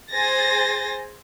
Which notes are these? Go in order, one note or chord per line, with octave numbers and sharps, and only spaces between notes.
G#4 C5 G#5 A6 A#6